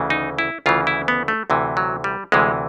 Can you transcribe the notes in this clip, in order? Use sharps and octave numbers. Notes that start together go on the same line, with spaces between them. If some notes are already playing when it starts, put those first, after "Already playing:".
Already playing: D2 C#3 E3
D#4
E4
D2 C#3 E3 F4
E4
B3
A3
D2 C3 E3
F#3
G3
D2 C3 E3 G#3